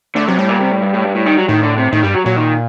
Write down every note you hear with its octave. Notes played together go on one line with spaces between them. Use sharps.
D3 A3
C3 F#3
A2 G3
A#2
C3
A2
G2
A2
G2
A2
D#3
F#3
A2 D#3
D3
C3
A2 D#3
G2 G3
F#3
A#2 F#3
D#3